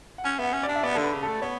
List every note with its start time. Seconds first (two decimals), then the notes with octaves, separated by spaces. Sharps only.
0.18 F#5
0.24 C#4 G#5
0.39 B3 E5 F#5
0.53 C#4
0.63 D5
0.68 D4
0.75 E5
0.83 B3 D5
0.95 A4
0.98 D3
1.03 B4
1.13 C#3
1.23 A4
1.28 A3
1.42 B3 C#5